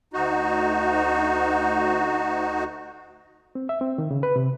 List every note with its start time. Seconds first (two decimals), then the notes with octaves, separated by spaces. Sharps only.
0.13 D2 D#4 F#4
3.55 C4
3.69 E5
3.81 C4
3.98 D#3
4.11 C#3
4.23 B4
4.36 C3